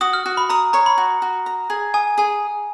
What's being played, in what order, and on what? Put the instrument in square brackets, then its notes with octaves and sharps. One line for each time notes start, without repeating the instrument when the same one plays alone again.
[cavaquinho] F#4 [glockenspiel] D#6
[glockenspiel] F6
[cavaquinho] F#4
[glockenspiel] B5
[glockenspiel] A#5 [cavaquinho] D#6
[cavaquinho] C#5 [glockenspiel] A#5
[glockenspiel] B5
[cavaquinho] F#4
F#4
A#5
G#4
[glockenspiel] G#5 [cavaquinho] D#6
[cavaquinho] G#4 [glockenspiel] G#5